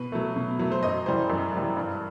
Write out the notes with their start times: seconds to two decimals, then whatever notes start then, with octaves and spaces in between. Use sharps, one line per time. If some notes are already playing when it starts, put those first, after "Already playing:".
Already playing: B2 B4
0.12 F#3 A3
0.36 B2
0.59 F#3 A3
0.72 C5
0.83 F#2 D#5
1.06 E3 G3 C5
1.30 F#2
1.53 E3 G3
1.77 G2